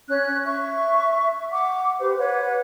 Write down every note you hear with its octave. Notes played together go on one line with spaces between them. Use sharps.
C#4 F#6
E5 C#6
F#5 D6
G4 B4 C5
B4 C#5 F#5